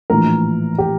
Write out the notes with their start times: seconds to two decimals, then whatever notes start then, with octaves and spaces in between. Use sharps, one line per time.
0.10 A#1 A2 E3 A#4
0.78 G4